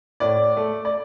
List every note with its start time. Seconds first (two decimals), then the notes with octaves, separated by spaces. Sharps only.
0.20 A2 D5
0.56 A3
0.85 D5